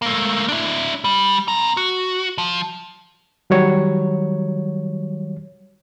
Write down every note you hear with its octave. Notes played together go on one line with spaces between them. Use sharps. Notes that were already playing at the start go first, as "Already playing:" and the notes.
A3 A#3
D4 E4
G3
C4 A#5
F#4
F3
D#3 F#3 G3 C#5